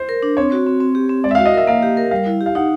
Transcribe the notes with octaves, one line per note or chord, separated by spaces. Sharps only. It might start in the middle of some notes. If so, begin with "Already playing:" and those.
Already playing: C5
A#4
D4
C4 C#5
F#4
C4
C4
G4
C4
G#3 D5
E5
F5
F#4
D#5
A#4 E5
A#3 F5
G4
A#4
G3 F5
E4
G4
F5
D#4 F#5